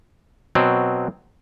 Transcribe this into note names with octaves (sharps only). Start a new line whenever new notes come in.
B2 F#3 C4